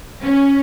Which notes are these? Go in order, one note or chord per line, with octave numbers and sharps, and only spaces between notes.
C#4